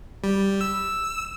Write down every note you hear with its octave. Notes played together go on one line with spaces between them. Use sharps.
G3
E6